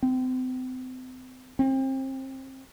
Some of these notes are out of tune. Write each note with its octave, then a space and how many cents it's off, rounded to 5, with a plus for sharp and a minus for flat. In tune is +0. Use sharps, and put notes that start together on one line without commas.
C4 -40
C4 +30